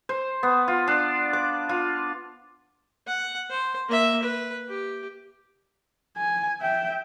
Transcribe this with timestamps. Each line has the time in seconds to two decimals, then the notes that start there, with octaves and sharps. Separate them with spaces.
0.09 C5
0.43 B3
0.68 F4
0.88 D4
1.33 D6
1.69 F4
3.07 F#5
3.50 C5
3.88 A#3 E5
4.23 B4
4.69 G4
6.17 G#5
6.61 E5 G5